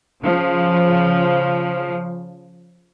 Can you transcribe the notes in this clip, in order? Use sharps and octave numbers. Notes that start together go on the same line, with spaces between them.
C#3 F3